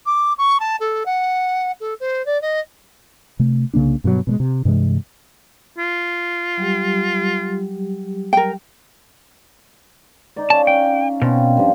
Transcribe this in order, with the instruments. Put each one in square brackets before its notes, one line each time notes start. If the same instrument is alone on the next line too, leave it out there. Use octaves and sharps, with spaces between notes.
[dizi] D6
C#6
A5
A4
F#5
A4
C5
D5
D#5
[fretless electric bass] C3 A3
C2 C#3 A#3 D4
G2 B2 D#3 F#3
B2 G3 G#3
C3
G2 C3 E3 G#3
[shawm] F4
[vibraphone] F#3 G3 G4
[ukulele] A#4 G5
[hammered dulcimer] D#4 D5
[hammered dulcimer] C#4 F5 [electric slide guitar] A5
[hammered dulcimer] C#4 [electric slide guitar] G5
[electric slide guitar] B2 [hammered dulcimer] C4 C#4 F4
[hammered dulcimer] G2 F3